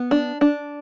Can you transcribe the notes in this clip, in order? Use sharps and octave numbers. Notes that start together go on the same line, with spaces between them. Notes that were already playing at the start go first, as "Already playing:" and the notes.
Already playing: B3
D4
D4